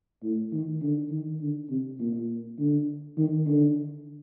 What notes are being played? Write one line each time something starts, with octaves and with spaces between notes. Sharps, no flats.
A2
D#3
D3
D#3
D3
C3
A#2
D3
D#3
D3